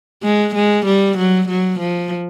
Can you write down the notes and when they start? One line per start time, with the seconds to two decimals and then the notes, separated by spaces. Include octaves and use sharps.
0.23 G#3
0.54 G#3
0.86 G3
1.17 F#3
1.48 F#3
1.79 F3